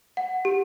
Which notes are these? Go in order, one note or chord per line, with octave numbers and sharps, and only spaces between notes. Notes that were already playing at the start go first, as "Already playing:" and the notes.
F#5
G4